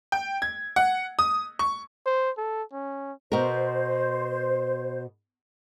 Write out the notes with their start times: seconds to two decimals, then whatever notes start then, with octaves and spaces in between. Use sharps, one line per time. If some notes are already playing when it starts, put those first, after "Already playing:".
0.12 G5
0.42 G#6
0.76 F#5
1.19 D#6
1.59 C#6
2.06 C5
2.37 A4
2.73 C#4
3.32 B2 A#4 C5